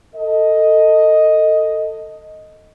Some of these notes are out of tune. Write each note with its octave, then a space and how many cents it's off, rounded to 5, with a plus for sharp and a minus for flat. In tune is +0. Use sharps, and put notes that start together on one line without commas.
A4 +20 D#5 +5